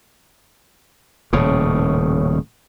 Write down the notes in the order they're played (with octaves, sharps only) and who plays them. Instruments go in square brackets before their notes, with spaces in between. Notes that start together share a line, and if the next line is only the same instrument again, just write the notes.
[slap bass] D#1 A2 C#3